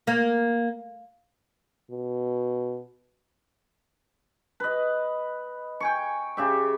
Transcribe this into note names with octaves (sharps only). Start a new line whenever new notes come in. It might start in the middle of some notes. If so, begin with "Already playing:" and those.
A#3
B2
B4 D#5
G5 G#5 C#6
C#3 G4 E5